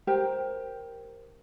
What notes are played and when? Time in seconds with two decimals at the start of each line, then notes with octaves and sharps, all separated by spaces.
0.07 G4 A#4 C5 G5